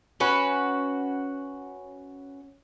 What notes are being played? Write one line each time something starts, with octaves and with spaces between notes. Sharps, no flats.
C#4 F#4 B4